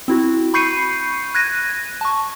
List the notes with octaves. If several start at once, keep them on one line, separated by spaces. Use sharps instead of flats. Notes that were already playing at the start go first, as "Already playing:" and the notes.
C4 E4 F#4
B5 C#6 G6 C7 C#7 D#7
F#6 G#6 A#6 D#7
A5 C#6